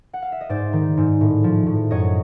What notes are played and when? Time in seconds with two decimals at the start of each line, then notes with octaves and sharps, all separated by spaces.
0.13 F#5
0.22 F5
0.32 E5
0.41 D#5
0.49 G#2 C5 D5
0.73 D#3
0.97 G#2
1.21 A2
1.44 F3
1.67 A2
1.91 F#2 C#5 D#5